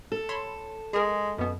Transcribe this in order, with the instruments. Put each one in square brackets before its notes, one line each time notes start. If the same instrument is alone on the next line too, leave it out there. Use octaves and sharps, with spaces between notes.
[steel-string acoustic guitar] A4
[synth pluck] C#5 B5 C6
[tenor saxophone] G#3 [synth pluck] G#4 A#4
[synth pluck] F#2 B3 [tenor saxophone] B2